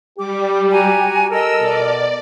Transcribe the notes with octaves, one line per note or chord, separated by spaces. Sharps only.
G3 G4 D6
F#4 G#5 A#5
A4 A#4 D#5 E6
B2 D5